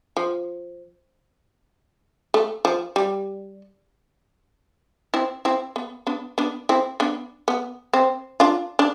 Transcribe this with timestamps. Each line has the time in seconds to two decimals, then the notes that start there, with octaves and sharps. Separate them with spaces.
0.17 F3
2.34 A3
2.65 F3
2.96 G3
5.14 C4 E4
5.45 C4 E4
5.76 B3
6.07 B3 D4
6.38 B3 D4
6.69 C4 E4
7.00 B3 D4
7.48 B3
7.93 C4
8.40 D4 F4
8.79 D4